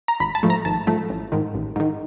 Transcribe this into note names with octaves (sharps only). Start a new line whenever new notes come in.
A#5
G#1 B5
A5
G#2 F3 A3
A#5
G#1 A5
G#2 F3 A3
A1
G#2 D#3
A1
G#2 D#3